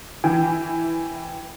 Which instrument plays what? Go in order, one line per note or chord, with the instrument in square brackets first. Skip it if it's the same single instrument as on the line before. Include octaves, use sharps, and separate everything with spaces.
[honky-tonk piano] E3 [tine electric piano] G5